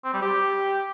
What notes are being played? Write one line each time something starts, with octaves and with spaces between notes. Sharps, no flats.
C4
G3
G4